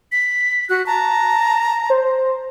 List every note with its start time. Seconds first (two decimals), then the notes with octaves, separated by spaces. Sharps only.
0.12 B6
0.69 F#4 F#6
0.86 A5 A#5
1.90 C5